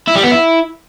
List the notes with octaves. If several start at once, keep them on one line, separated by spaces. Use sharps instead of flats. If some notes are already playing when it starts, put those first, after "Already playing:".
E4
G3
B3
E4